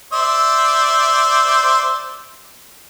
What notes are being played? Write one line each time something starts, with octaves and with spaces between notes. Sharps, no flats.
C5 D5 E5